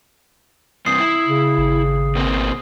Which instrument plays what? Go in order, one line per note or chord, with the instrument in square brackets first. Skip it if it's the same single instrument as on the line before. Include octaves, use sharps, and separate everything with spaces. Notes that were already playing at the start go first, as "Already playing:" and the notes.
[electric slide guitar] G2 C3 [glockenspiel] D#6 C7
[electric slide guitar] E4
[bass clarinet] C#3
[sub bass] G#1
[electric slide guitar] B2 A#3 C4